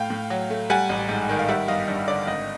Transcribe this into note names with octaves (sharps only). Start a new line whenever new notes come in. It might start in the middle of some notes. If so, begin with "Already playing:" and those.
Already playing: A2 F5 G5
A2
F#3
A3
G3 F#5 G#5
A1
G#2
D#3
F5
G3 E5 F#5
G1 D#5 F5
G2
D3 D5
G#1 D#5